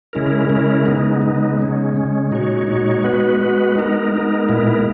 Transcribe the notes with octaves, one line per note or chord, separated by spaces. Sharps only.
C#3 G#3 C#4 E4 A#4
C#3 G#3 C#4 E4 A#4
C#3 G#3 B3 D#4
C#3 G#3 B3 D#4
C#3 G#3 C#4
C#3 G#3 C#4
A#2 G#3 D#4 F#4 C#5
A#2 G#3 D#4 F#4 C#5
G#3 B3 F#4 B4
G#3 B3 F#4 B4
G#3 B3 D#4 A#4
G#3 B3 D#4 A#4
A#2 G#3 B3 E4 A#4